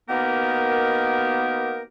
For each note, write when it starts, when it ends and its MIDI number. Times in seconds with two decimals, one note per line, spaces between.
0.08 1.82 47
0.08 1.82 51
0.08 1.82 58
0.08 1.82 59
0.08 1.82 67
0.08 1.82 70